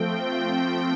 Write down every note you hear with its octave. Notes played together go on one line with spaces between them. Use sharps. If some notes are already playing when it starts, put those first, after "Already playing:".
Already playing: F3 A3 C4 G5
G5